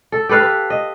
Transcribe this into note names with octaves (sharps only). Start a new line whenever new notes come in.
A4
G4 A4 B4 F5
B4
D#5